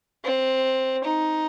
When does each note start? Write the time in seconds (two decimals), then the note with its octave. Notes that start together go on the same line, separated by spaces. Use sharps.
0.24 C4
1.04 D#4